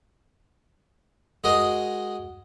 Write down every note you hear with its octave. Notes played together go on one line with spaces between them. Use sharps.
G#3 F#4 G#4 A#4 D#5